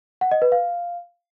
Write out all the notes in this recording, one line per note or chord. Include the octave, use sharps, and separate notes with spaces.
F#5
D#5
B4
F5